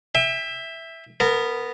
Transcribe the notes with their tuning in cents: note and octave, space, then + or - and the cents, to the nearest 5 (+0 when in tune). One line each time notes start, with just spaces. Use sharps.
E5 +0 G5 +40
B3 +0 A#4 -30